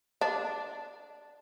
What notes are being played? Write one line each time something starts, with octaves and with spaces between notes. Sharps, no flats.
D4